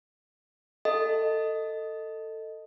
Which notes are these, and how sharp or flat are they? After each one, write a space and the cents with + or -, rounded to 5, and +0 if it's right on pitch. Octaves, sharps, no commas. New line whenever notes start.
A4 +20 D#5 +0